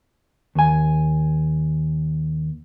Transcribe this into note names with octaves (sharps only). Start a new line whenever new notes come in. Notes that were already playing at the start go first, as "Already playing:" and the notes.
D#2 G#5